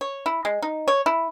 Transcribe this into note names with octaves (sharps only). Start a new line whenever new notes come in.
C#5
E4
G#3
D#4
C#5
E4